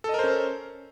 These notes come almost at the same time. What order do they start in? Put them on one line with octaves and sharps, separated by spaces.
A4 D#5 A#4 C5 C#4